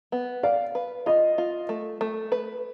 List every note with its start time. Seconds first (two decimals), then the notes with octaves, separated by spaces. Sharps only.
0.12 B3
0.43 D5 F5
0.75 B4
1.06 F4 D#5
1.38 F4
1.69 A3
2.01 A3
2.32 B4